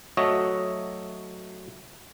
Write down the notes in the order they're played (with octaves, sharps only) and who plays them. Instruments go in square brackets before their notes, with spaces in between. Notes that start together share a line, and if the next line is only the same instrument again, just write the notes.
[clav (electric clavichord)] F#3 A3 F#4 C#5 D#5 E5